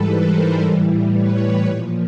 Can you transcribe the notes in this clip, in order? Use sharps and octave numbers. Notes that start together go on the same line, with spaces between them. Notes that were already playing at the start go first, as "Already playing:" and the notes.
Already playing: G#2 E3 G3 A4 B4
A#4 C5
A2 E3 G3
B4 C#5
A#2 F3